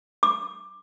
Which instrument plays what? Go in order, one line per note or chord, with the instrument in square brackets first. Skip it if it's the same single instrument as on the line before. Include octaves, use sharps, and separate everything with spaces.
[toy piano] D6